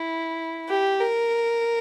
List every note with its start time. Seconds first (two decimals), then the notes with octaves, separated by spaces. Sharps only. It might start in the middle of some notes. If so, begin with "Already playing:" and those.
Already playing: E4
0.69 G4
1.00 A#4